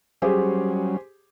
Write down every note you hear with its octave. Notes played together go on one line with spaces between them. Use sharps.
F#3 G3 C#4 G4 G#4 C5